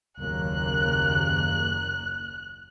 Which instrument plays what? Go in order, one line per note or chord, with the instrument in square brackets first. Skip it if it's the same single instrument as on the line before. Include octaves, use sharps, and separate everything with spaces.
[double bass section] F#1 D#2 A#3 [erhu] F#6